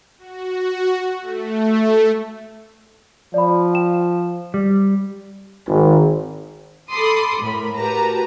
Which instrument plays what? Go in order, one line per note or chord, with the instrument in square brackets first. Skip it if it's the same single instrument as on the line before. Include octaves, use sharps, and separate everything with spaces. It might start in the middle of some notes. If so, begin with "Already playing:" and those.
[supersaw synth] F#4
A3
[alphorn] F3 [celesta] D5 B5
[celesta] G5 E7
[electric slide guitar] G3
[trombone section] G#1
[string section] A4 B5 C6 D6 D#6
A2 A#4 B5
F#4 G4 A#4 B4 A5 A#5